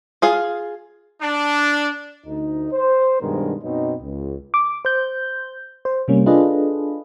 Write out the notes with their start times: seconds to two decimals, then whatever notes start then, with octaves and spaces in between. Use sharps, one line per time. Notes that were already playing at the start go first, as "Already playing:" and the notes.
0.22 F4 G#4 F5
1.22 D4
2.26 D2 D#4
2.72 C5
3.20 G2 B2 D#3 G#3 D4 A#4
3.62 F#2 B2 F#3 C4 D#4
4.01 C#2
4.54 D6
4.85 C5 G6
5.85 C5
6.08 C3 G3 A#3 C#4
6.26 D4 F4 G#4 A4 B4 D#5